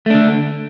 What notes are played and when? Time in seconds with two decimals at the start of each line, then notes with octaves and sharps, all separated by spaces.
0.06 A3
0.10 D4
0.14 D3